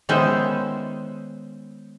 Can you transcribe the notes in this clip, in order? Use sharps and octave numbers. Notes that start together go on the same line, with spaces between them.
D#3 G#3 B3 C#4 C5 E5